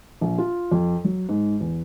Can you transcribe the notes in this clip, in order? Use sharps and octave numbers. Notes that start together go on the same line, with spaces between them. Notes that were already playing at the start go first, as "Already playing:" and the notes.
A#1
F4
F2
F#3
G#2
E2